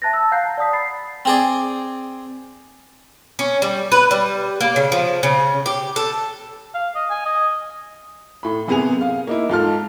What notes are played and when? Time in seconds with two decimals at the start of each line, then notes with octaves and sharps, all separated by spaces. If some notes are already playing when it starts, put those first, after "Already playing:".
0.02 E5 A5 F#6 A6 A#6
0.13 E6
0.32 F5 F#5 A#5 F#6 G6 C7
0.43 A5
0.58 D5 F#5 D#6 B6
0.73 B5 A6 C7
1.25 C4 G#4 D5
3.39 C#4
3.62 G3
3.92 B4
4.11 G3
4.61 A#3
4.76 C#3
4.92 F3
5.23 C#3
5.66 G4
5.96 A4
6.74 F5
6.95 D#5
7.10 G#5
7.26 D#5
8.43 A2 B5
8.67 F#2 C3 B3 G#4 G#5 F7
9.01 F5
9.27 A#3 D#4 E4
9.50 G#2 F4 A4 F6